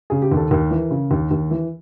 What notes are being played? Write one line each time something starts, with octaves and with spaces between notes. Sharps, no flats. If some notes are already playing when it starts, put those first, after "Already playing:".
C#3 G#4
G4
D#2
A4
D#2 A#4
E3
C#3
D#2
D#2
E3